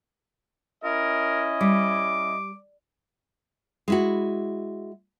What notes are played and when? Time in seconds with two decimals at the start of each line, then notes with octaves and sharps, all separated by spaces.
0.84 C#4 E4 A#4 D#5
1.61 G3 D6
3.88 G#3 E4 F#4